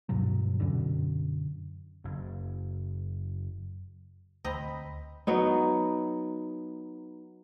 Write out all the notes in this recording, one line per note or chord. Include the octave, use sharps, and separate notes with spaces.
D2 G2 B2 F#3
F#2 B2 D3
F#1 F#2
D2 C4 D#5 A#5 B5
F#3 B3 D#4